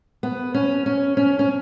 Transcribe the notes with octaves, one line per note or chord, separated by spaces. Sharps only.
B3
C#4
C#4
C#4
C#4